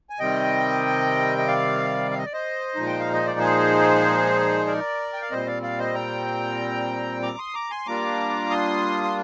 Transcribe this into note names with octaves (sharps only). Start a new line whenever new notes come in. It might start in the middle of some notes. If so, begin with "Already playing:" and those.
G#5
C3 D#3 G3 C4 D#5 G5
D#5
D5 F5
F5
D#5
D5
C5 D#5
A#2 F3 G#3 D#4
G5
F5
D#5
D5
G#4 C5
A#4 D5
G5
F5
A#2 G3 C4 C5 D#5
D5 F5
D5 F5
C5 D#5
G5 A#5
A#5 D6
C6 D#6
A#5 D6
G#5 C6
G3 A#3 D4 F4 A#5 D6
C6 D#6
C6